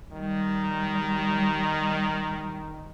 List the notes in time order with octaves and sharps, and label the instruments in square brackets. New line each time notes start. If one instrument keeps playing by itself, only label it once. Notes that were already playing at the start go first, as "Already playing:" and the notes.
[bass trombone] D#3 [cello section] G3